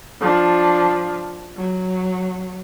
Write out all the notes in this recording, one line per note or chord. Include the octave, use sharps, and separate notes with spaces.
F3 D4
F#3